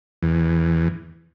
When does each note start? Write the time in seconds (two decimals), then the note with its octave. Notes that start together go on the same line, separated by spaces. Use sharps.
0.23 E2